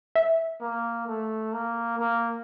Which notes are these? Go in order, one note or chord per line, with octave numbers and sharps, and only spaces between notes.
E5
A#3
A3
A#3
A#3